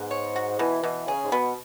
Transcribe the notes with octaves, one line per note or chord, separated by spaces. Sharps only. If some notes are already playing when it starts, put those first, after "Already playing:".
Already playing: G#2 B3
C#5
F#4
B2 E3
B2 E3
C#3 G#4
G#2
B2 B3